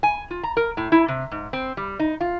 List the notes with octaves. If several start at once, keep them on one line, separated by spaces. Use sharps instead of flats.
G#5
F4
A#5
A#4
A2
E4
C3
G#2
C4
G3
D#4
F4